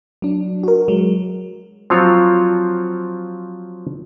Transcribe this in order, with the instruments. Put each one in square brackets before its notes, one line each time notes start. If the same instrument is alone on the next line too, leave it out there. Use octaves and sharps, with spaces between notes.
[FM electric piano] F#3 D4
F#4 A#4
F#3 G#3
[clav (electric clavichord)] F3 F#3 C4 F4 C#5